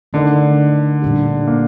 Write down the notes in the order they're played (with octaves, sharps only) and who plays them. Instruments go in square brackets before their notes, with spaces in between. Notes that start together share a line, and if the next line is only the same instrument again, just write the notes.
[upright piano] D3 [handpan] A3 D#4 A#4 D#5
[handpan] A#2 G3 D4 G4
[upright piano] A#3